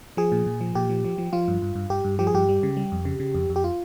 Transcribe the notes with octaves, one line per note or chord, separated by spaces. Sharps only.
F3 G#4
A#2
A#2
F3
A#2 G4
F3
F3
F3
F3 F4
G2
G2
G2
G2 G4
G2
F3 G4
G#4
G2 G4
G3
C#3
G3
F2
C#3
C#3
F2
F2
G4
F4